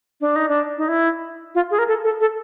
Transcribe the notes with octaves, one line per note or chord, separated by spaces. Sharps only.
D4
D#4
D4
D#4
E4
F4
G#4
A#4
A4
A4
A4